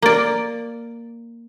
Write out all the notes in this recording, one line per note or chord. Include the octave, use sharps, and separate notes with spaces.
A#3 D5